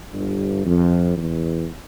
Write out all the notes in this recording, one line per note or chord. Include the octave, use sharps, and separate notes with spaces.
G1 G2
F2
E2